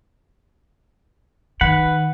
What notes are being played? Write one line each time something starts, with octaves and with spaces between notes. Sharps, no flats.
D#3 B4 F#5